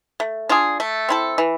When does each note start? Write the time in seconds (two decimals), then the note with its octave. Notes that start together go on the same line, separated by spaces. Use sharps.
0.20 A3
0.49 D4 F4 G#4
0.80 A3
1.09 C4 E4 A4
1.38 E3